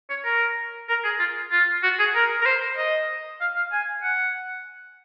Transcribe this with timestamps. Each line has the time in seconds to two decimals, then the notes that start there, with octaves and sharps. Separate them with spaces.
0.10 C#5
0.25 A#4
0.89 A#4
1.04 G#4
1.19 F4
1.52 F4
1.83 F#4
1.99 G#4
2.15 A#4
2.41 A#4
2.46 C5
2.77 D#5
3.41 F5
3.56 F5
3.72 G#5
4.03 F#5